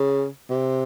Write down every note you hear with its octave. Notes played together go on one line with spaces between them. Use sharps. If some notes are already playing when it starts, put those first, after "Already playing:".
Already playing: C#3
C3